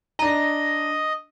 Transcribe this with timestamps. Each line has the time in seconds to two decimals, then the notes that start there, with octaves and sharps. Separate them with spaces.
0.19 D4 D#5 A#5